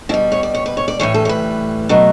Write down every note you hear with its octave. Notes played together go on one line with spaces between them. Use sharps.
B2 G3 E4
C#5
D5
C#5
B4
C#5
D5
A2 E3 G3 C#5
A4
C#5
B4
B2 F#3 A3